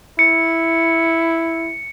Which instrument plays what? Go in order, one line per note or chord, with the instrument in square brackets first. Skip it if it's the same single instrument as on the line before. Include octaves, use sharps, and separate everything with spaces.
[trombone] E4 [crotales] C#7